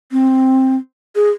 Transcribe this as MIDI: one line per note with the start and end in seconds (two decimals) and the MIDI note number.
0.12 0.76 60
1.16 1.31 68